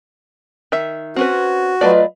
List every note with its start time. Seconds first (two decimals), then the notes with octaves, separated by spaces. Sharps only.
0.72 D#3 E5
1.16 C4 C#4 F#4 B4
1.81 F#3 A3 F4 B4 D5 D#5